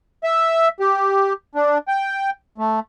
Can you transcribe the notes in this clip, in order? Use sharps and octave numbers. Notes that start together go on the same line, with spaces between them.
E5
G4
D4
G5
A3